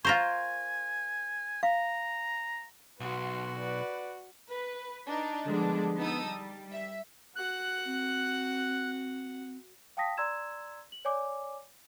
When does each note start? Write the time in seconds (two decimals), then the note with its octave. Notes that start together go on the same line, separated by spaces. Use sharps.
0.05 F4 A#4 C5 G#5 C#6
1.63 F5 A#5
3.00 B1 F#4 B4 C6
3.58 B4 D5
4.50 B4
5.06 D4 D#4
5.46 D3 F3 G3 G#3 B3 D4
5.97 B3 D#4 A5 D#6 E6
6.27 G3
6.71 E5
7.36 F#4 F#5 F#6
7.86 C4
9.97 F5 G5 A5 D#6 A#6 B6
10.17 D5 A#5 C6 E6 G#6 E7
10.92 F#7
11.05 C#5 D5 G#5 D6